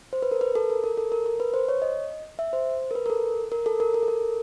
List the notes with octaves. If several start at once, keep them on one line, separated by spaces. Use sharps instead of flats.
C5
B4
A#4
B4
A4
A#4
A#4
A4
A#4
A#4
B4
C5
C#5
D#5
E5
C5
A#4
B4
A#4
A4
A#4
A4
A#4
A#4
A4
A#4